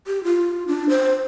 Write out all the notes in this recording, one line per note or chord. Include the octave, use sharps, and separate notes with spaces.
G4
F4
D4
C5